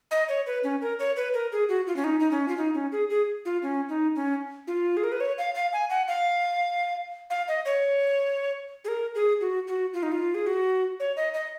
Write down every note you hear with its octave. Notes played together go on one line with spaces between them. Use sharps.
D#5
C#5
B4
C#4
A#4
C#5
B4
A#4
G#4
F#4
F4
C#4
D#4
D#4
C#4
F4
D#4
C#4
G#4
G#4
F4
C#4
D#4
C#4
F4
G#4
A#4
B4
C#5
F5
F5
G#5
F#5
F5
F5
D#5
C#5
G#4
A#4
G#4
F#4
F#4
F4
D#4
F4
G#4
F#4
C#5
D#5
D#5